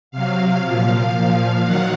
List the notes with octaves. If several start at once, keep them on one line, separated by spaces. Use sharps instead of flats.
C3 F#3 F5
A#2 F3
A#2 F3
D#3 F#3 F#5